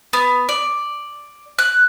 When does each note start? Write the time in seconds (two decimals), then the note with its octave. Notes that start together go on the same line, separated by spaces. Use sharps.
0.13 B3
0.49 D5
1.59 F#6